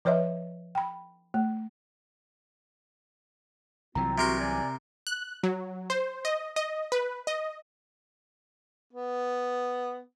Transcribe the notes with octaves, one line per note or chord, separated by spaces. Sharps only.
F3 B4 C#5 D#5 E5
G5 B5
A3
C2 E3 F#3 C4 F4 A#5
C3 F#4 A#4 C6
D5 G#5
F#6
F#3
C5
D#5
D#5
B4
D#5
B3